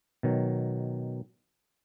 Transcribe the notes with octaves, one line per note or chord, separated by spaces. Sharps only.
B2 D#3 F#3